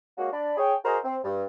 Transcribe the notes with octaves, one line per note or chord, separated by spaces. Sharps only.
G#3 A#3 C#4 F#4
D4 D5 B5
G#4 C#5 G5
F#4 G#4 A#4 C5 D#5 A#5
C4
G2